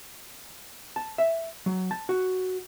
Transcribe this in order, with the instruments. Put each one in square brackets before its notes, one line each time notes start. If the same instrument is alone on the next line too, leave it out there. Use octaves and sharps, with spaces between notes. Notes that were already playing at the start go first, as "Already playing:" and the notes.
[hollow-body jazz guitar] A5
E5
F#3
A5
F#4